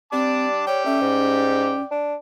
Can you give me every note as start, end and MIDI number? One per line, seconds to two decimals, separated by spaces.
0.13 0.80 55
0.13 0.46 60
0.13 0.65 81
0.13 0.65 86
0.67 0.83 73
0.67 1.96 74
0.67 1.96 79
0.86 1.01 57
0.86 1.83 61
1.01 1.76 44
1.91 2.15 62